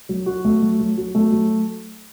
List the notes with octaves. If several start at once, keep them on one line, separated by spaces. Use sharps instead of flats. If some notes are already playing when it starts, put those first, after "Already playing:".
F#3
F#4
A3
F#3
F#3
F#4
A3
F#3